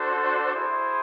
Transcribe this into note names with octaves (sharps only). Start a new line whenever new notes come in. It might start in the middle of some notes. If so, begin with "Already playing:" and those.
Already playing: D4 F#4 A4 C5
E4 G#4 C5